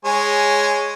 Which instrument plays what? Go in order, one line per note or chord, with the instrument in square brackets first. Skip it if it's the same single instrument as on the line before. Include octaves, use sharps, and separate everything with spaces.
[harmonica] G#3 C#5 G#5